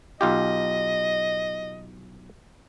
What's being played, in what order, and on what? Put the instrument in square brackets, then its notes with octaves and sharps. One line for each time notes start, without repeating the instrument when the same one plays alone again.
[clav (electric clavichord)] B1 F4 G4 [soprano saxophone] D#5